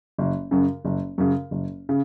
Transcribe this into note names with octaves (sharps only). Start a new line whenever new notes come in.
F#1
F#2 C#3
F#1
F#2 C#3
F#1
C#3